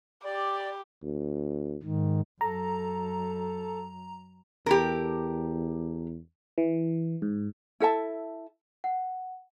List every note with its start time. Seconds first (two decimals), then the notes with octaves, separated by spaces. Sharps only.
0.25 G4 D5
1.03 D2
1.83 G#2 D#3
2.41 F#2 A4 A#5
4.66 E2 G4 A4 A#4
6.58 E3
7.22 G#2
7.80 E4 A4 E5 A5
8.84 F#5